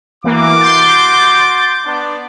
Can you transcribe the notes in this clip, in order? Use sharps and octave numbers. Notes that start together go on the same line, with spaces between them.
E3 A#3 F#4 D6
C6 G6 A6
B3 D4